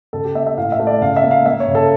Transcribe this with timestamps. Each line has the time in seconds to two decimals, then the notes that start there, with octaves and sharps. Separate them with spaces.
0.13 C#3 A4
0.24 G4
0.35 A#3 E5
0.47 E5
0.57 A2 F5
0.72 E5
0.80 A3
0.87 D5
1.01 C#3 F5
1.16 E5
1.24 A#3
1.31 F5
1.46 A#3 E5
1.60 C#5
1.68 C#3
1.75 A4